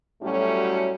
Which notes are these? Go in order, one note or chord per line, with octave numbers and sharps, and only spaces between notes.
A2 F#3 G3 A3 C#4 F#4